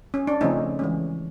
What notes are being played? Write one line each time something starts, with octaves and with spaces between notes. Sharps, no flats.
C#4
D4
C#3 F3 A3 C4 C#4 D#4
E3 G#3 C#4